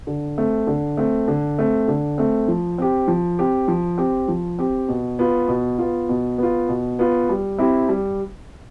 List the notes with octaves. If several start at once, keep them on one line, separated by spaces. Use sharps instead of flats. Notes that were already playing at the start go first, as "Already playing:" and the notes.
D3
A3 C4
D3
A3 C4
D3
A3 C4
D3
A3 C4
F3
C4 G4
F3
C4 G4
F3
C4 G4
F3
C4 G4
B2
B3 F4
B2
B3 F4
B2
B3 F4
B2
B3 F4
G3
C4 E4 G4
G3